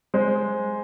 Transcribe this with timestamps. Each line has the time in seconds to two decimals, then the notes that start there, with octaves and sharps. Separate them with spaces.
0.14 G#3 C5